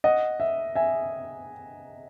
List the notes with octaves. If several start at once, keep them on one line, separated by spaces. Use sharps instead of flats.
D#5 F#5
E5
E5 G#5